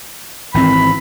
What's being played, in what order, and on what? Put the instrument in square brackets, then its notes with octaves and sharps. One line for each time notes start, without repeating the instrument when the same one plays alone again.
[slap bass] G#1 E3 C4 [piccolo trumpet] B5